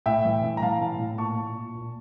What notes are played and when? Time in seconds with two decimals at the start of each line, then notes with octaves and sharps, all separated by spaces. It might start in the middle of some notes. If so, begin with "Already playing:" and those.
0.06 A2 E5 G5
0.25 E3
0.43 A2
0.57 A#5
0.62 E3 F5 A5
0.80 A2
0.99 A2
1.18 A#2 A5 C#6
1.37 A#2
1.55 A#2
1.75 A#2